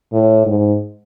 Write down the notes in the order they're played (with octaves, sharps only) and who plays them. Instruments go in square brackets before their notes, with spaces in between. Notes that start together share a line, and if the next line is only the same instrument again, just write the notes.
[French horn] A2
G#2